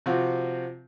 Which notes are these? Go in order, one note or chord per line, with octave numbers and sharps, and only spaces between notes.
C3 F3 C4 F4 F#4